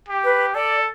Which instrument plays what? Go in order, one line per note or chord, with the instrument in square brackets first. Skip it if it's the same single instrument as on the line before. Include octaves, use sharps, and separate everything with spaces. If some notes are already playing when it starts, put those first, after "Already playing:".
[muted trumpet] G4
[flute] B4
[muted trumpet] A4 [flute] D5